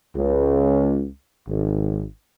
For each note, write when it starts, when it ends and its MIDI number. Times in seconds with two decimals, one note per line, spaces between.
0.15 1.07 37
1.48 2.03 32